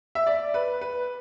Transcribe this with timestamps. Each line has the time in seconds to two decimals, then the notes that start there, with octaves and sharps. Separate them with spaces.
0.15 E5
0.27 D5
0.54 B4
0.81 B4